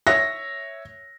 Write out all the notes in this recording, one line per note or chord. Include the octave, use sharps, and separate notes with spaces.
C#5 E5 A#6